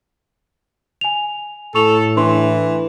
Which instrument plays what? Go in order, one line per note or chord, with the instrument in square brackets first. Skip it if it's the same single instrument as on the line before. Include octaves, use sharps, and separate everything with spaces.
[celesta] G#5 F7
[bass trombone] A2 [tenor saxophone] A4 [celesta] C#6 F7
[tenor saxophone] E3 [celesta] D4 C6